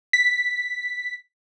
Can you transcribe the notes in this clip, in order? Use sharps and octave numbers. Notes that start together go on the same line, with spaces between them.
B6